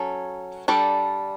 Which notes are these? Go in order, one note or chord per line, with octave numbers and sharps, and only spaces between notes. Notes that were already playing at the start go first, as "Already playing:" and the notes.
Already playing: F#3 C#4 A4
G3 D4 A4 D5